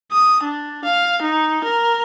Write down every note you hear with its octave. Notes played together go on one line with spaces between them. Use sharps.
D#6
D4
F5
D#4
A#4